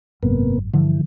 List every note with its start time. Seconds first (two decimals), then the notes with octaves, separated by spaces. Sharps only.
0.23 G#1 F#2 C3 A#3 B3
0.74 G2 D3 E3 F3